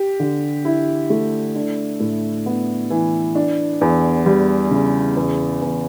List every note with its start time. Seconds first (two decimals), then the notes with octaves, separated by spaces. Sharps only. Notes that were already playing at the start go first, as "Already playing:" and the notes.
Already playing: G4
0.20 D3
0.65 E4
1.10 A3
1.55 D4
2.00 A2
2.46 B3
2.90 E3
3.35 D4
3.81 E2
4.26 G3
4.71 C#3
5.17 E2
5.62 E2